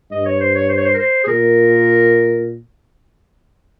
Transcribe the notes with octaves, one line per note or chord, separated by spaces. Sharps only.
G2 D#5
C#5
C5
C#5
C5
C#5
C5
A#4
C5
G#4
A#2 A#4